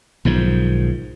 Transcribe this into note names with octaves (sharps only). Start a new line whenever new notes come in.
B1 G#2 D#3 F3